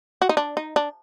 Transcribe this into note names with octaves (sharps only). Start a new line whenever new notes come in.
F#4
D#4
D4
D#4
D4